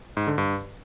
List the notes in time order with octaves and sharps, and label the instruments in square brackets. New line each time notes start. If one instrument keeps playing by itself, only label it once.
[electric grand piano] G#2
D3
G2